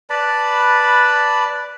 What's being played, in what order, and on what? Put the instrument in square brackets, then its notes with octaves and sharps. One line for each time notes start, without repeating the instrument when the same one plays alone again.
[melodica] B4 D5 A5 B5